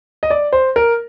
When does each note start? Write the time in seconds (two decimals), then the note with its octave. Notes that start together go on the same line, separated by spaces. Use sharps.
0.23 D#5
0.30 D5
0.53 C5
0.76 A#4